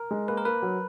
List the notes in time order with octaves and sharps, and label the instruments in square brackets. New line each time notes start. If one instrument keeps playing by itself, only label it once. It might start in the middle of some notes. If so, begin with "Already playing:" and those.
Already playing: [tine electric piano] A#4
[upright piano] G#3
[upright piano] A#3 [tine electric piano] B4
[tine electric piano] A#4
[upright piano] A#3 [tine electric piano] B4
[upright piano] F#3